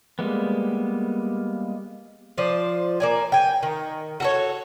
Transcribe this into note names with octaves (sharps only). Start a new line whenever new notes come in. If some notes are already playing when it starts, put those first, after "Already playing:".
G3 G#3 A#3 B3
F3 C5 D5
A#3 D5 G#5
G5 G#5
D#3
F#4 A4 C#5